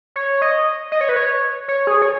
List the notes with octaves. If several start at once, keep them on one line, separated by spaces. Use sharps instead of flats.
C#5
D#5
D#5
C#5
B4
C#5
C#5
G#4
C#5